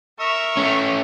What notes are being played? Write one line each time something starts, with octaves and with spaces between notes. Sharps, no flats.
A#4 E5 C#6
A3 C#4